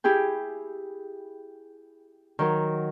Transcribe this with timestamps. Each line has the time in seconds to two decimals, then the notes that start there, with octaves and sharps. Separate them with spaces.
0.04 E4 G4 G#4 G5
2.39 D#3 F#3 A#4